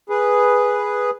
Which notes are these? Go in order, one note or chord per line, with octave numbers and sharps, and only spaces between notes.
G#4 B4